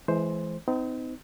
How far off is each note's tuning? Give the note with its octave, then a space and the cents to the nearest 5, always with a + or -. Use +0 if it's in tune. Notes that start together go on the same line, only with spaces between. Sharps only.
E3 +5 G#3 +30 C5 +5
C4 -40 D#4 +10